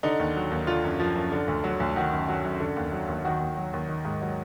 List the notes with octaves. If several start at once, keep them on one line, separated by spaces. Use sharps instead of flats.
D3 D#4
D#2
F#3
D#2
D3 F4
F#2
F3
F#2
D3
D2
F#3
D2
D#3 F#4
F#2
F#3
F#2
D3
D#2
F#3
D#2
D#3 F#4
D#2
F#3
D#2
D#3
G#2
F#3